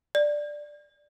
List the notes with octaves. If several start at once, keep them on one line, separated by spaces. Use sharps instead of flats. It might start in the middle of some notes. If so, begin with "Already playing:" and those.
D5